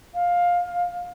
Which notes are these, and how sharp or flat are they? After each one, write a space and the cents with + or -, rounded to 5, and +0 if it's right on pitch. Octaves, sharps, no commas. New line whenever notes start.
F5 +15